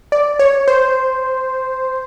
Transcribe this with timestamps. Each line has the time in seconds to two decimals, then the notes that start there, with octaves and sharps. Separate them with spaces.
0.12 D5
0.39 C#5
0.68 C5